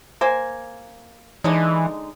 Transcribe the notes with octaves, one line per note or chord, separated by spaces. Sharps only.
A#3 C5 G#5
D3 E3 G#3 D#4